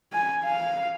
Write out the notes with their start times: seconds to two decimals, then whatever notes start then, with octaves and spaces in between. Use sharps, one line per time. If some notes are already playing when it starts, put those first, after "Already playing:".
0.13 G#5
0.44 F5